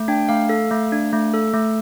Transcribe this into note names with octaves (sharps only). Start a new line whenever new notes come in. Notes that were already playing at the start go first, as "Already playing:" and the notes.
Already playing: A3
D4 G5
A3 F5
A4
A3
D4
A3
A4
A3